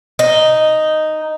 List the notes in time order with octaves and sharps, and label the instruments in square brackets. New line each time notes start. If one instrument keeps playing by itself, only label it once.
[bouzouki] D#4